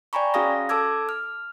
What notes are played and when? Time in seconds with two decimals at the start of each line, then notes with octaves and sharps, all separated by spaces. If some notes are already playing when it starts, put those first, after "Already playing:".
0.13 D5 G5 G#5 A#5 B5 C#6
0.34 C#4 F#4 G#4 F5 D#6 A#6
0.69 A4 A5 D6 E6 G#6
1.09 F6